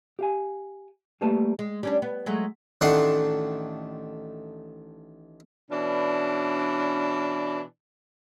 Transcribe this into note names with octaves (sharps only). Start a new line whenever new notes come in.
G4 F5 G#5
G3 A3 A#3 G4 B4 A5
G#3
G3 C#4 D4
B3
F#3 G#3 A3
A1 D#3 A3 D4 F#5 C6
B2 E3 C#4 D4